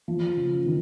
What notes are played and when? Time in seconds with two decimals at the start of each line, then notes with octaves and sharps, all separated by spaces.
0.08 F3
0.37 C#3
0.66 D#3